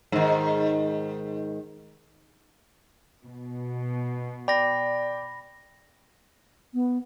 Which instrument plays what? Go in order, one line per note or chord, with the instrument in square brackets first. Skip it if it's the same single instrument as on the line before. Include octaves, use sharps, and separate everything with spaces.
[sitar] G#2 D#3
[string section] B2
[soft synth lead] D5 [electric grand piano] G5 [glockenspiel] B5 A#6
[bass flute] B3